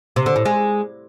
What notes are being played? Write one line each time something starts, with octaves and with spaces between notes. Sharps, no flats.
C3
D3
A2
G#3